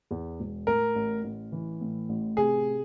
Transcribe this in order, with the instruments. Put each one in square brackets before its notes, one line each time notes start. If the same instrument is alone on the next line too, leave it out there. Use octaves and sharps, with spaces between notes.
[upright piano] E2
E1
[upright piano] A2 [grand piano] A#4
[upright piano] A1
A1
E3
A2
A1
[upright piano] C3 [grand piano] G#4